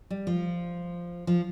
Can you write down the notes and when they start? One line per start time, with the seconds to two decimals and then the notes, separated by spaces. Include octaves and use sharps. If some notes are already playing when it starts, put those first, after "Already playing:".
0.10 G3
0.27 F3
1.27 F3